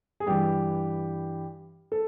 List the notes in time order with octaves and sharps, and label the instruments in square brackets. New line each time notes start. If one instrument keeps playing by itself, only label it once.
[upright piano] G#4
G2 E3 G4
A4